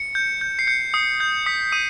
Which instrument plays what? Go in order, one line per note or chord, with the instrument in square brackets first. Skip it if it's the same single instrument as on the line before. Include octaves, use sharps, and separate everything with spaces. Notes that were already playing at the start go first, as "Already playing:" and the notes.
Already playing: [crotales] C#7
G6
G6
C7
G6 C#7
D#6 C7
G6
D#6 B6
D#6 D#7